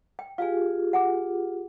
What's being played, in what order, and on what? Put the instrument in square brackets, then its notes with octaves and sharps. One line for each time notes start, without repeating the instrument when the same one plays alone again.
[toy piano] G5
[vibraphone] F4 G4 G#4 [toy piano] F5 G5 G#5
[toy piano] F#5 G#5 D6